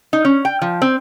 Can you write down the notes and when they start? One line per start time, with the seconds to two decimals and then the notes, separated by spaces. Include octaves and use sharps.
0.13 D#4
0.25 C#4
0.45 G5
0.62 F3
0.82 C4